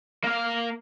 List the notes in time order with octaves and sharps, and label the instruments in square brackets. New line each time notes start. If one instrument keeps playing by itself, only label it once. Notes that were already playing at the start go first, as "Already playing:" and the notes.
[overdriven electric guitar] A#3 F5